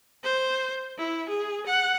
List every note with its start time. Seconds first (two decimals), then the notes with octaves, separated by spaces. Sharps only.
0.23 C5
0.98 E4
1.28 G#4
1.66 F#5